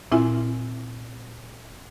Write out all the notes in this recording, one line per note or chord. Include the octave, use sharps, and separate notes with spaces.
A#2 C4 E4 F4 E5 G#5